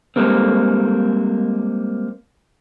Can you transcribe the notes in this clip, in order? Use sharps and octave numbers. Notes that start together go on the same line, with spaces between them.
G3 G#3 A#3 C4